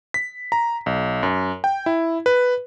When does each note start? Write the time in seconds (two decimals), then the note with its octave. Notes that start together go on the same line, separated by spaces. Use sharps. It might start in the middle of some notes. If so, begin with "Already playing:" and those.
0.14 B6
0.52 A#5
0.86 B1
1.23 F#2
1.64 G5
1.86 E4
2.26 B4